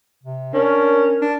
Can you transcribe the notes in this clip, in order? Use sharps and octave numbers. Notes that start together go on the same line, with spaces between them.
C3
C#4 D4 A#4
D4